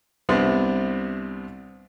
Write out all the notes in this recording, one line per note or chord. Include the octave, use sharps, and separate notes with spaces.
C2 C3 B3 C4 D4